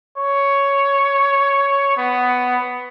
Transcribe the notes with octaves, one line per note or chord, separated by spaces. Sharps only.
C#5
B3